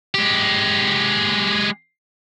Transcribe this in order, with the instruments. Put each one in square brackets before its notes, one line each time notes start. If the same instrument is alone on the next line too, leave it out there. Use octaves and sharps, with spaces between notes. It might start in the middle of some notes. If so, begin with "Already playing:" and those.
[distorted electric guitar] G#3 G4